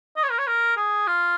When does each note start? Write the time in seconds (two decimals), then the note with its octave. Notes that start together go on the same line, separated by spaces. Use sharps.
0.16 D#5
0.23 C#5
0.30 A#4
0.38 C#5
0.47 A#4
0.77 G#4
1.07 F4